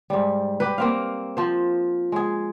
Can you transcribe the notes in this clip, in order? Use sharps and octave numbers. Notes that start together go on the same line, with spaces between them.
G#2 G3
G4 B4
A#3 C4 F5
F3 C5
G#3 G#4